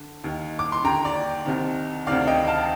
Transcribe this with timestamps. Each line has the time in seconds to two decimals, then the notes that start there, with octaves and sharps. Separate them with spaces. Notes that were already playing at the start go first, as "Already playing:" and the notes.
Already playing: D3
0.24 D#2 D#3
0.59 D6
0.72 C6
0.84 D#2 D3 G5 A#5
1.05 D5
1.46 C2 C3 D#3
2.07 D2 C3 D#3 D5 F5
2.27 D#5 G5
2.47 F5 A5